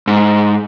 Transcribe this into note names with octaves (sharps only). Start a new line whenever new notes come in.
G#2